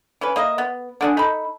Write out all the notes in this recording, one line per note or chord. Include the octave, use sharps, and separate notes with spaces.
E3 C#4 B4
A#3 D#5 E5
B3
D3 D4 G#4
D#4 A4 B5